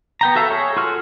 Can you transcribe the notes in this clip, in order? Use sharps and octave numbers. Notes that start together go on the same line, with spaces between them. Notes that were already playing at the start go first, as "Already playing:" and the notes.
B3 G5 A#5
F#4 A4 E5 F5
G#4 C#5
F4 F#4 A4 F6